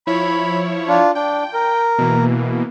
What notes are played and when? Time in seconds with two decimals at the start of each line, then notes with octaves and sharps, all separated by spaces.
0.07 F3 E4 C#5 B5
0.88 D4 F4
1.15 D4 G5
1.54 A#4
1.98 B2 E3 A#3